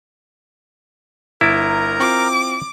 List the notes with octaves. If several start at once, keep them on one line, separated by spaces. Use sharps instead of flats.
G1 E4 A#4 A#5 A6 D7
C4 F4 D6